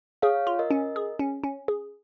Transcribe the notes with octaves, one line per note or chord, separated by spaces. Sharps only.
G#4 C#5 F5
F4
A#4 D#5
C#4
G#4
C#4
C#4
G#4